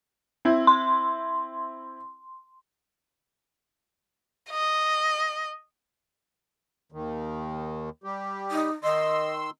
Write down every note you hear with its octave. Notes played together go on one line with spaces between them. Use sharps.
C4 E4
C6
D#5
D#2 D#3
G3 G4
D#4
D#3 D#5 C6 E6